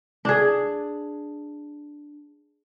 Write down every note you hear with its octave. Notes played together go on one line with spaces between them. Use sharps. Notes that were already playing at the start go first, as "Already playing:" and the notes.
D4 G#4